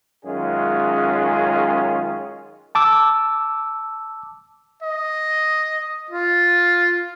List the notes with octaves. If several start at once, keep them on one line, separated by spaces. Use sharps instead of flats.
F#2 D#3 G#3 C#4 F4 G#4
A5 D6 E6
D#5
F4